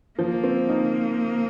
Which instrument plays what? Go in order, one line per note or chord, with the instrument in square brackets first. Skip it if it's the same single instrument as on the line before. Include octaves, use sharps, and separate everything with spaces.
[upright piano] F3 [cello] A#3
[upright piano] C4
D#4